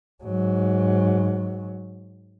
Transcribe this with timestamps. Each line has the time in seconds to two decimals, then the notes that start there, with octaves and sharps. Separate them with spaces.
0.24 G#2 F#3